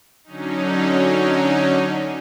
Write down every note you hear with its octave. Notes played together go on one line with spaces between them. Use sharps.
D3 F#3 C#4 D#4